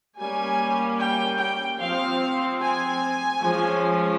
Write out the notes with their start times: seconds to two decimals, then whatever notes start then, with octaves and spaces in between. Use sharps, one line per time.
0.20 G3 A#3 C#4 G#5
1.01 G5
1.41 G5
1.80 F3 C4 F5
2.61 G#5
3.41 F3 G#3 C#4